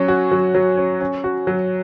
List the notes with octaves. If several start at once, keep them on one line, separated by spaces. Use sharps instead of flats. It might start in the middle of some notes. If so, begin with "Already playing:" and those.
Already playing: F#3 C#4
F#4
F#3
F#3
C#4
C#4
F#4
F#3